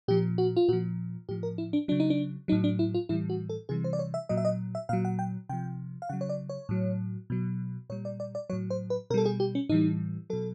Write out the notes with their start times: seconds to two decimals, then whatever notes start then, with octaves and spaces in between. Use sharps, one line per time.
0.08 A#2 F3 G4
0.38 F#4
0.57 F4
0.69 A#2 F#4
0.73 F3
1.29 A2 F3 G4
1.43 A#4
1.58 E4
1.73 D4
1.88 C#3 F#3 D4
2.00 D#4
2.10 D4
2.48 F#3 D#4
2.52 A2
2.64 D4
2.79 E4
2.94 F4
3.09 A2 E3 G3 E4
3.30 F#4
3.49 A4
3.69 C3 E3 G3 G#4
3.84 C5
3.93 D5
3.99 C#5
4.14 E5
4.29 A#2 F#3 D#5
4.37 E5
4.45 D#5
4.75 E5
4.89 A#2 F#3 F5
5.05 F#5
5.19 G5
5.49 C3 F3 G5
6.02 F5
6.09 C#3 F#3 F#5
6.21 C#5
6.29 D5
6.49 C#5
6.69 A2 F#3
7.30 B2 F#3
7.90 A#2 G3 C#5
8.05 D5
8.20 D5
8.35 D5
8.49 F#3 C#5
8.53 A2
8.70 C5
8.90 B4
9.10 B2 A#4
9.14 G3 A4
9.26 G#4
9.40 G4
9.55 C#4
9.69 A2 E3 G3 D#4
10.30 B2 F#3 A4